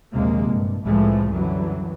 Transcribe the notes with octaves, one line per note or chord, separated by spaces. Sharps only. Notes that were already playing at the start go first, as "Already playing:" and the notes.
A#1 D#2 C3 G#3 A#3
G2
C2 A2 E3 F3 G#3 A3
F#2 D3 E3 F#3 G3